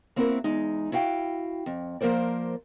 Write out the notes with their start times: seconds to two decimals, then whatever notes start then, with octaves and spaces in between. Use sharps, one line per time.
0.16 A#3 C4 E4 F#4 G4 A#4
0.44 E2 G#3 D#4
0.92 E4 F#4 F5 G5
1.66 F2
2.01 F3 A#3 A#4 C5 D5